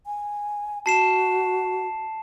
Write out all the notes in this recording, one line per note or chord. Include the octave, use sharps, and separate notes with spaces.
G#5
F#4 A5 C7 E7